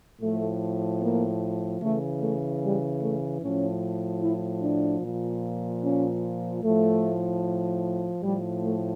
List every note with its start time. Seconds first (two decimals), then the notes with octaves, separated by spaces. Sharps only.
0.20 A2 F3 A3
1.00 A#3
1.81 C#3 E3 A3
2.21 A3
2.61 G3
3.01 A3
3.41 A2 F3 C#4
4.21 E4
4.62 D4
5.01 A#2 F3
5.82 C#4
6.62 A2 F3 A3
8.22 A2 F3 G3
8.62 A3